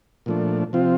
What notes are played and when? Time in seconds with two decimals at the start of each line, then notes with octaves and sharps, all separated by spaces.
0.26 A#2 F3 A3 D4
0.73 C3 F3 C4 F4